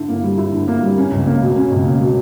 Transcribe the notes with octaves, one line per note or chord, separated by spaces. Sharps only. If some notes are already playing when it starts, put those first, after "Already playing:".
Already playing: D3 E4
A#3
G3
E4
D3
A#3
G3
C#4
C#2
A#3
B2
C#4
C#2
A#3
B2